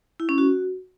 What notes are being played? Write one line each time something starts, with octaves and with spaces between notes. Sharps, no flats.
E4
C#4
F#4